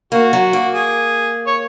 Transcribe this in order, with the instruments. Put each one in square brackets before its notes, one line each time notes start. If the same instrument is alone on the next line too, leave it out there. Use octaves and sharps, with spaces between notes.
[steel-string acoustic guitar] A#3 [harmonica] F#4
[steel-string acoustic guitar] F#3
A#3
[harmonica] G#4
C#5